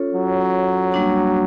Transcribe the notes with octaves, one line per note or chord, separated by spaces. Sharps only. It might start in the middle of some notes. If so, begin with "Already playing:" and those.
Already playing: C#4 F4 A4 C#5
F#3
G3 A#3 D4 F#4